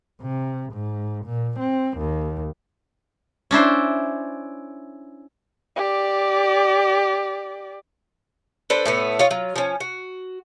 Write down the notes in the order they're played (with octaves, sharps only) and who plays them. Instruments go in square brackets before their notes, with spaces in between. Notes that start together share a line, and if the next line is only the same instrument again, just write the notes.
[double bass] C3
G#2
A#2
C4
D#2
[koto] C#4 D4 E4 C5
[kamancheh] G4 D5
[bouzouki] D4 A4 B4 C5
A2 A3 B3
F4 C#5 D#5 F5
F#3 F4
F3 C#4
F#4